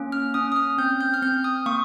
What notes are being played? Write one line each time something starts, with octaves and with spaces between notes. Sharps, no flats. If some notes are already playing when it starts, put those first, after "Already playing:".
Already playing: A#3 C#4
F6
C#4 D#6
D#6
F6
C4 G6
G6
F6
C4 G6
D#6
A#3 C#6